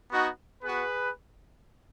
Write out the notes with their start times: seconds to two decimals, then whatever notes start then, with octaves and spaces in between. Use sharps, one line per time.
0.10 B3 D#4 F#4
0.63 B3 F#4 G#4 B4